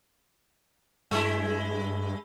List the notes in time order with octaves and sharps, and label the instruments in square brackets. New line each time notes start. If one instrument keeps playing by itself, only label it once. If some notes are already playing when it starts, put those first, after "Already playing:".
[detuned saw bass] G2 [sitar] G#3 E4